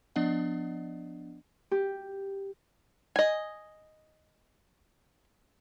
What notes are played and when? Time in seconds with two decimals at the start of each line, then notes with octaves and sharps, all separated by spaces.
0.16 F3 B3 D4 D5 D#5 F#5
1.71 G4
3.16 D#5 G#5